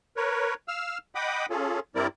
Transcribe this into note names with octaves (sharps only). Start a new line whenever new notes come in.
A#4 B4 C#5
F5 E6 F6
D#5 F#5 G5 B5 D6 D#6
C#4 F4 G#4 A4
G2 G3 C4 E4 A#4 D5